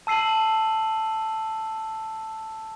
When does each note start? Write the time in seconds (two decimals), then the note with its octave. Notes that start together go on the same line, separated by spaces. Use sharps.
0.07 A5 E6 C7 D#7 F#7